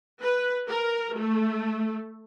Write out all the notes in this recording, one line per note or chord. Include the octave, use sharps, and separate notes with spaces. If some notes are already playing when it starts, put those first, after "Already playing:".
B4
A#4
A3